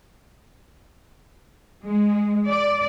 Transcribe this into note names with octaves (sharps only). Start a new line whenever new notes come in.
G#3
D5